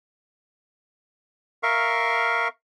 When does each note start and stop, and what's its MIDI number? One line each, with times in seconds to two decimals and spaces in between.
1.63 2.48 70
1.63 2.48 76
1.63 2.48 77
1.63 2.48 85